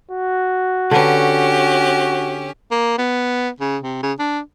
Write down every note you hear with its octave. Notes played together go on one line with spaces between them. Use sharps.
F#4
D3 C#4 G4 B4
A#3
B3
C#3
C3
C#3
D4